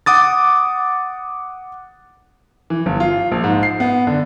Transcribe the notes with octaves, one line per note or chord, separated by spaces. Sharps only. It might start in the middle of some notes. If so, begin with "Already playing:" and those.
F#5 D6 D#6 A6
E3
G1
F4
A#1
G#2
C7
B3
D3